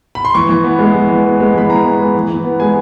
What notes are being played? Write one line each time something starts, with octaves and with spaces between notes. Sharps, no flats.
B5
C6
E3 C#6
E3
B3
G#3
E3
E3
B3
G#3
E3 B5
E3 A#5
B3
G#3
E3
E3
B3
G#3 G#5